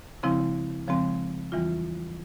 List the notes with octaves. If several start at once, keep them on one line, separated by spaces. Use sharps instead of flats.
C#3 F3 G#3 C4 E4
C#3 F3 G#3 C4
E2 E3 G3 C4 F4